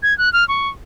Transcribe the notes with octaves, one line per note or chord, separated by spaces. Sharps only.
G#6
F#6
F6
C#6